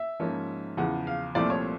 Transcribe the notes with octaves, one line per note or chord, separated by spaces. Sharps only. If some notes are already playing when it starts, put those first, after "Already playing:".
Already playing: E5
G#2 F3 A#3 C#4
E2 C#3 F3 F#5
F5
C2 A#2 F3 A3 C4 D5
C#5